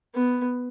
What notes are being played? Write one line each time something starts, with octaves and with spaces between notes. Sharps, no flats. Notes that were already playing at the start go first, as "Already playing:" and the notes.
B3